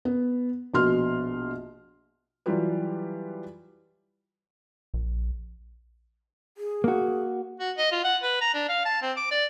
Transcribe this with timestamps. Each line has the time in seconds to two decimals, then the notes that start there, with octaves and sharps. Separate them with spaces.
0.05 B3
0.74 A#1 B2 C6 F6
2.46 E3 F#3 G3 F4 G4 B4
4.94 A#1
6.58 G#4
6.84 A#3 F#4
7.60 F#4
7.78 D#5
7.92 F4
8.04 F#5
8.23 B4
8.41 A#5
8.54 D4
8.69 F5
8.85 A5
9.02 C4
9.17 D6
9.31 D5